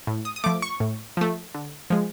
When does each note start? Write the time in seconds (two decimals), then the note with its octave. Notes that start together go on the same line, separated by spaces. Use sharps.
0.07 A2
0.25 D#6
0.36 D#6
0.44 F3 A3 D6
0.62 C#6
0.80 A2
1.17 F3 A3
1.54 D3
1.90 F3 G#3